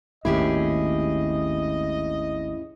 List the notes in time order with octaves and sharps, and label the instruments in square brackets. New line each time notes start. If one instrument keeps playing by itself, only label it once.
[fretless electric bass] G#1 D#2 A2 [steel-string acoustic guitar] C#4 G4 G#4 [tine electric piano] E4 [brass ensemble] D#5